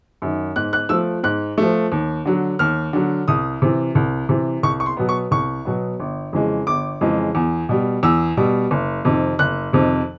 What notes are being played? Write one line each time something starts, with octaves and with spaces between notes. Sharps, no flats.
F#2 D#3
G#2 F#6
F#6
F3 A3 E6
G#2 F#6
F3 A3
D#2
D3 F#3
D#2 F6
D3 F#3
C2 D#6
C3 E3
C2
C3 E3
C2 C#6
C#6
C6
B2 F#3 B3
C#6
C2 C#6
B2 F#3 B3
G1
F2 C#3 E3 G#3
G1 D6
F2 C#3 E3 G#3
E2
B2 G3
E2 E6
B2 G3
F#1
F2 C3 D#3
F#1 F#6
F2 C3 D#3